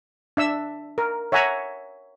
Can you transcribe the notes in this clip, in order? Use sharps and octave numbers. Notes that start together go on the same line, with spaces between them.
D4 E5 E6
A#4
C#5 E5 F#5 G#5 A#5